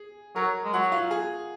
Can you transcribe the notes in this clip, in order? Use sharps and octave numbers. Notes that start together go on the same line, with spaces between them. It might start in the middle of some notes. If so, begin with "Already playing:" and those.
Already playing: G#4
F#3 A#4
G#3
F#3 F#4 F#5
F4 F5
G#4 G#5